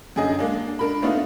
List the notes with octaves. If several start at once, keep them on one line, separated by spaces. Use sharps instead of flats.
F#2 D3 G#4 D#5
G#3 A#3 D4
D4 A#4 B5
A3 B3 D4 D#4 F4